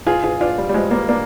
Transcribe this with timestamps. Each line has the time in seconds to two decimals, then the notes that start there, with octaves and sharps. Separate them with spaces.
0.07 F4 G#4
0.24 F4 G#4
0.41 D4 F4
0.58 G3
0.69 G3
0.74 F3 G#3
0.91 G3 A#3
1.09 A#3 D4